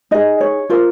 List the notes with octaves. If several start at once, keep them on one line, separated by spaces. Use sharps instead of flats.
D#4 G#4 D#5
C#5
F4 A#4 C5